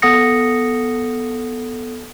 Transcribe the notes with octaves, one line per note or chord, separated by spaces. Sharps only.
B3 A4 F#5 D#6 A#6 C#7